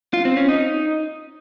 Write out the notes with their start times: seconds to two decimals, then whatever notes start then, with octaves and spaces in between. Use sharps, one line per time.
0.13 F4
0.25 C4
0.37 C#4
0.48 D#4